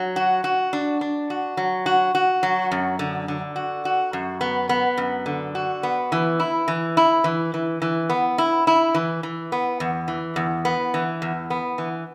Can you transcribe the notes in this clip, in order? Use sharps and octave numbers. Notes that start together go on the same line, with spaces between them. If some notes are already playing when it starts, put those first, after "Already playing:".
Already playing: F#3
F#4
F#4
D4
D4
F#4
F#3
F#4
F#4
F#3
F#2
D3
D3
F#4
F#4
F#2
B3
B3
F#2
D3
F#4
B3
E3
E4
E3
E4
E3
E3
E3
B3
E4
E4
E3
E3
B3
E2
E3
E2
B3
E3
E2
B3
E3